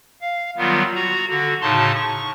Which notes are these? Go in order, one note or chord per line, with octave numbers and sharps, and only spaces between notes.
F5
D#3 F#3 G3 B3 F4
F#4 A#5
D3 F#4
A2 C#3 D#4 A5 C6
C#6